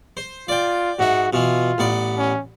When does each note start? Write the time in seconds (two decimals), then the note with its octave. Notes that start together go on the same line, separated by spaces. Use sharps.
0.17 C5
0.48 F4 D5 G5
0.99 G#2 F#4 E5
1.33 B2 E3 F4
1.78 A1 B3 D5
2.17 C#4